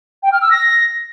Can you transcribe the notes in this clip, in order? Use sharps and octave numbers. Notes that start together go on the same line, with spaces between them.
G5
F6
E6
A#6